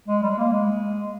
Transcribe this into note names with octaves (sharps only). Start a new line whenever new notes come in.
G#3
G3
G#3
A#3
G#3